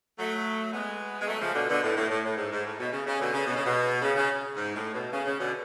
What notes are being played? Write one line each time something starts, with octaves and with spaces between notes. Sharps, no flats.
F#3 A3
G#3 B3
G#3
F#3 A3
C#3 F3
B2 D3
B2 D3
A2
A2
A2
A2
G#2
G#2
A2
B2
C#3
C#3
B2 D3
C#3
B2
C#3
B2
C#3
C#3
G#2
A2
B2
C#3
C#3
B2 D3